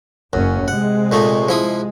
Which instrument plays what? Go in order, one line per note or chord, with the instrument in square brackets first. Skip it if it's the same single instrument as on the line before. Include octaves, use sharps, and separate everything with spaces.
[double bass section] F#1 C#4 [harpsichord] F#2
[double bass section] C3 G#3 [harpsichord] F#5
[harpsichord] A#2 A3 D#4
F3 E4 D#6